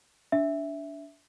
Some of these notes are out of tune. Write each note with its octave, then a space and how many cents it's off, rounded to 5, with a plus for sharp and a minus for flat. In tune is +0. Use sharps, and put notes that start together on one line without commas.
D4 -20 E5 +0